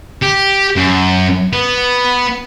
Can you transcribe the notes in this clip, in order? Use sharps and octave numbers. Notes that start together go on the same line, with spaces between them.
G4
F#2
B3